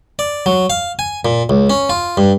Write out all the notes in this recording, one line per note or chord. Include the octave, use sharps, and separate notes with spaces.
D5
F#3
F5
G#5
A#2
C#2
C#4
F4
G2